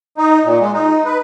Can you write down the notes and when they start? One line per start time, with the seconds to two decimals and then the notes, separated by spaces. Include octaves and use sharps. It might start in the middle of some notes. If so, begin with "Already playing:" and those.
0.18 D#4
0.45 A#2
0.61 G#3
0.73 D#4
1.05 B4